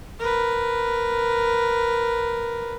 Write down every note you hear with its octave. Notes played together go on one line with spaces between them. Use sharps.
A#4 B4